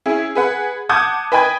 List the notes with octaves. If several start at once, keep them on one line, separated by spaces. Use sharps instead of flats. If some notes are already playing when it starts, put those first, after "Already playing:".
C#4 E4 G#4
G#4 B4 F#5
F#5 A5 D6 D#6 G6 G#6
B4 D#5 G5 G#5 B5 G#6